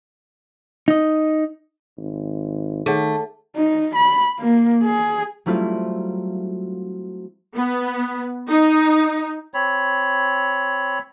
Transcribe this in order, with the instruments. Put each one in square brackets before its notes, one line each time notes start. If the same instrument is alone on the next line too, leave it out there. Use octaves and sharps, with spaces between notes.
[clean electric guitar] D#4 D#5
[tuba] G#1
[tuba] D#3 [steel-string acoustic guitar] A3 [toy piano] G#4 C#5 F#5
[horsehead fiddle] D#4
B5
A#3
G#4
[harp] F#3 G3 A3 C4 E4 F4
[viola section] B3
D#4
[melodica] C4 C#5 B5